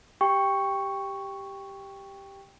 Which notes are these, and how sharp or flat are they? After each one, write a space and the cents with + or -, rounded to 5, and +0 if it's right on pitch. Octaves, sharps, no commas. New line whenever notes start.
G4 +0 G5 +10 C#6 +0